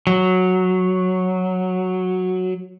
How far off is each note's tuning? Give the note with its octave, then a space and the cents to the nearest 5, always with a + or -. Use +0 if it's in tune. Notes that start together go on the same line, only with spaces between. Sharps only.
F#3 -5